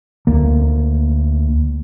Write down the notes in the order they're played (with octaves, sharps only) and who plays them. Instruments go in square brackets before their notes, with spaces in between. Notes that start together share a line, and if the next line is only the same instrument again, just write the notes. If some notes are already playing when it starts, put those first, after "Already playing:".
[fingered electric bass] D2 A#3